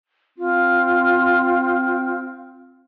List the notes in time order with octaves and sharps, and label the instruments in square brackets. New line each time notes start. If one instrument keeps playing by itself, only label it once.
[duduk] C4 [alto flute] F4